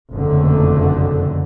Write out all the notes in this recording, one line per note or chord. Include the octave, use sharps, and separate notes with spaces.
F#1 B1 F2 D3 A3